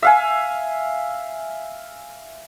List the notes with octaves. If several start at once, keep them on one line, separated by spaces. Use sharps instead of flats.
E5 F5 G#5